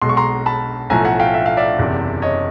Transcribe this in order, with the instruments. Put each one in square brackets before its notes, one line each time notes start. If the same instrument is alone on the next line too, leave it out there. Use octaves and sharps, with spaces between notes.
[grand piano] B1 B2 G#3 C6
C#6
A#5 C6
A5 B5
B1 A2 F3 A3 G#5 A#5
F#5 G#5
F5 G5
E5
F5
D5 E5
F#1 E2 C3
C#5 D#5